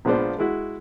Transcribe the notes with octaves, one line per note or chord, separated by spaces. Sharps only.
A#1 F3 G#3 B3 D4 C5
G#3 E4 F#4